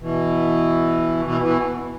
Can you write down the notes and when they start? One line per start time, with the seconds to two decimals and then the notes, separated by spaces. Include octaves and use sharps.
0.01 B2 E3
1.25 B2 E3
1.41 B2 E3